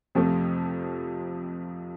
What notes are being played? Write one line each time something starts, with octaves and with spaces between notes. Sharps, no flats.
F2 C3 F3 A3